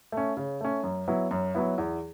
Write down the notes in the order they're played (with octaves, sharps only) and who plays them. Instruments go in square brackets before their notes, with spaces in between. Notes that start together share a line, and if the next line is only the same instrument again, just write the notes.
[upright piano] A3 C#4
C#3
A3 C#4
F#2
F#3 B3 E4
F#2
F#3 B3 E4
E2